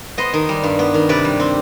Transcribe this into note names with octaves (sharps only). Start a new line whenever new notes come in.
B3 C5 D#5
D#3
G3
G2
B3
D#3
C3 B4 D5
G3
C4